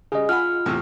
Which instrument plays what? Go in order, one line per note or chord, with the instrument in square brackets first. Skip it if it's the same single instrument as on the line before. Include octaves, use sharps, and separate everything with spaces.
[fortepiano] C#3 G3 [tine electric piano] G#4 D#5
[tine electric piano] F4 [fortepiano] F#5 G#5 B5 [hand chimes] F6
[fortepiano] E2 A2 C3